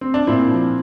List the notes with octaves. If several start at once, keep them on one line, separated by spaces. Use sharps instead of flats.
C4
D4
A#2 C4 E4
F3